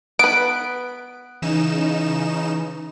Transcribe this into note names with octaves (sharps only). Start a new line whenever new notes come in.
B3 B4 D7
C#3 E3 D#4 E7